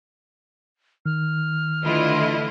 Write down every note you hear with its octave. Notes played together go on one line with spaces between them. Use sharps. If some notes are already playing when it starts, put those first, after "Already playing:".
D#3 F6
D3 E3 A3 E4 F4 D#5